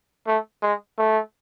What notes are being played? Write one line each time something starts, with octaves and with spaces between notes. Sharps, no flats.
A3
G#3
A3